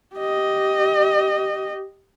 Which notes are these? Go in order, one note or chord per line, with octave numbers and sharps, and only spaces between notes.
G4 D#5